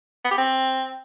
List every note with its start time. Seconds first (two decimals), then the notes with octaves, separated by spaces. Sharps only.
0.24 B3
0.31 G4
0.38 C4